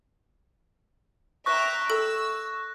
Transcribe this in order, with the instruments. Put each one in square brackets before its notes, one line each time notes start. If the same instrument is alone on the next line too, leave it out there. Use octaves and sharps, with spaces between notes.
[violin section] E5 G5 A#5 [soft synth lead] C#6 [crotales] F#6 A#6
[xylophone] A4 [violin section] E6